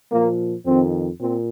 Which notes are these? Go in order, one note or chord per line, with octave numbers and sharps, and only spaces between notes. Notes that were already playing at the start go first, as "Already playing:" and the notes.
A#2 F3 A#3
F2 D#3 C4
A#2 C4